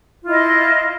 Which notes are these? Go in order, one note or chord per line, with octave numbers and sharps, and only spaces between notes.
E4 F4 D#5